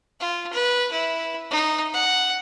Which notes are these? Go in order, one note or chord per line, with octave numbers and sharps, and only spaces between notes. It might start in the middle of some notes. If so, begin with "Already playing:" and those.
F4
B4
E4
D#4
F#5